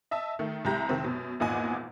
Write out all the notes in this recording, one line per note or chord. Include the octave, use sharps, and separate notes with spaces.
D#5 E5 A5
D#3 A3
C2 G#3 G4 A#5 G6 A#6
F1 D#3 C4
F#2 B2
G#1 E2 A#2 D#5 F#5 G#5